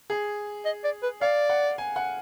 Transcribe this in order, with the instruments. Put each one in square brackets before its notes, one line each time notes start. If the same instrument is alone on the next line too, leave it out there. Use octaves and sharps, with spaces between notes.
[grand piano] G#4
[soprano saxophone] D#5
D5
B4
[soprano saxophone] D5 [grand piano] F5
[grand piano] F#5
G#5
F#5